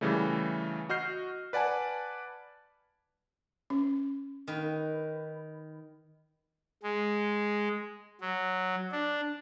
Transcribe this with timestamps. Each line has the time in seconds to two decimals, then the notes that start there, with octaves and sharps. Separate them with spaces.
0.01 C#3 E3 G3 A3
0.89 F#4 D#5 F6 G6 C7
1.53 B4 D5 F#5 G#5 A5
3.70 C#4
4.48 D#3 B4
6.83 G#3
8.21 F#3
8.92 D4